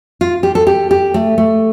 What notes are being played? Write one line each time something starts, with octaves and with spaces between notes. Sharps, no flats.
F4
G4
A4
G4
G4
A3
A3